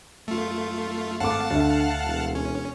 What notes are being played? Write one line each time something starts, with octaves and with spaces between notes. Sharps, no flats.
F#2 A3 F4
G#1 A3 F5 F#5 A5 D6
D2 D3 E5
E1
C#4